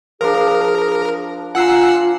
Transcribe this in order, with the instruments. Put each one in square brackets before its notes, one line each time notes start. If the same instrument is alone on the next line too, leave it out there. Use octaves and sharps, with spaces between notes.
[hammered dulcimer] F3 D4 [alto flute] G#4 [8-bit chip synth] A#4
[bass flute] F4 [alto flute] F5 [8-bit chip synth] F#5 E6 C7 [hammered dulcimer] G#5 A#5